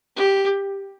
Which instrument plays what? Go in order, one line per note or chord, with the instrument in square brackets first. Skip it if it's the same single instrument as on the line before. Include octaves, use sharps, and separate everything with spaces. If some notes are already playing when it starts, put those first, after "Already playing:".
[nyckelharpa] G4